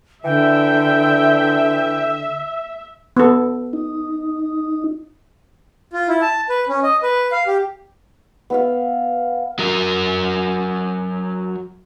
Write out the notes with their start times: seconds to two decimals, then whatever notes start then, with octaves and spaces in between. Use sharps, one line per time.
0.24 D3 E3 E5 G5
3.17 B3 A4
3.73 D#4
5.93 F4
6.08 E4
6.21 A5
6.49 B4
6.69 C#4
6.83 D#5
7.03 B4
7.32 F5
7.47 G4
8.50 B3 E5 F5
9.59 F#3 A#4